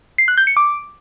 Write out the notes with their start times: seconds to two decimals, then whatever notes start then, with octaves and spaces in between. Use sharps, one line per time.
0.18 C7
0.28 F#6
0.38 G6
0.47 C#7
0.57 D6